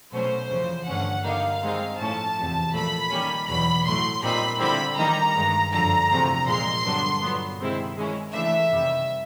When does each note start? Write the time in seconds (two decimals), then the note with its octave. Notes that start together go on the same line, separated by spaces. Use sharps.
0.12 B2 F#3 A3 C#4 C5
0.50 E2 C#3 F3
0.87 G2 D3 F3 A3 C#4 F#5
1.24 D3 G3 A#3 D#4 F5
1.61 D#3 G#3 C4 D#4
1.98 A2 F3 A3 C#4 A5
2.36 E2 C3 F3
2.74 A#2 F3 A3 B5
3.11 D#3 G3 A#3 C#4
3.47 E2 B2 F#3 B5
3.85 A2 F#3 A3 C6
4.22 A#2 G3 C4 D#4 B5
4.59 D3 G3 C4 E4 B5
4.97 D#3 G3 A#3 D#4 A#5
5.35 G2 D#3 G#3
5.71 F#2 D3 F3 A#5
6.09 E2 C3 F3 A3 C4
6.46 A#2 F3 G#3 C6
6.84 G2 D3 F#3 B3 D4
7.21 A#2 F#3 B3
7.58 C3 D#3 G#3 C4 E4
7.96 D#3 G#3 C#4 E4
8.32 C#3 E3 A3 D4 E5
8.70 F2 C3 D#3 G3